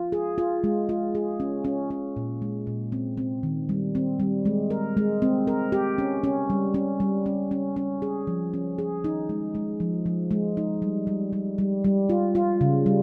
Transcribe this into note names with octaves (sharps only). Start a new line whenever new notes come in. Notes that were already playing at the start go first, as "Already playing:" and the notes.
Already playing: F4
G#4
F4
G#3
F4
G#4
C#4
C#4
C#4
A#2
G#3
A#2
C4
C4
D#3
G3
C4
G3
G#3
A#4
G#3
C4
A#4
G4
C#4
C#4
G3
C#4
G3
C#4
C#4
C#4
G#4
F3
C#4
G#4
D#4
G#3
G#3
F3
F3
G#3
D#4
G3
G3
G3
G3
G3
F4
F4
C#3
G3